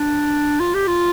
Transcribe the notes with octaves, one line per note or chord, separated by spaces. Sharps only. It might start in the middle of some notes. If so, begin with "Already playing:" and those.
Already playing: D4
F4
G4
F4